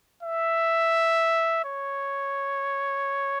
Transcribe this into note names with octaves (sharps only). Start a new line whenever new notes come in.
E5
C#5